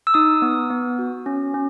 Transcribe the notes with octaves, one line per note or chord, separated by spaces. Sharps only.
E6
D#4 D#6
B3
B3
F#4
C#4
C#4